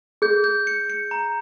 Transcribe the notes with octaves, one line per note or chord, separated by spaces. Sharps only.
G#4 G6
G6
C#7
C#7
A#5